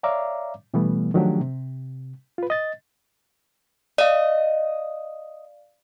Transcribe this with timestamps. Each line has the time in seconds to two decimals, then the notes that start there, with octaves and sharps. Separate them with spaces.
0.03 C#5 D5 E5 F5 A#5 D6
0.74 B2 E3 G3 A3 B3
1.14 D#3 F3 F#3 A3 D4 G4
1.41 C3
2.38 F4 B4
2.50 D#5 A6
3.98 D5 D#5 F5